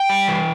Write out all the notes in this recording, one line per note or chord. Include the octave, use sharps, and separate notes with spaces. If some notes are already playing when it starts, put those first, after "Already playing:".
Already playing: G5
G3
E3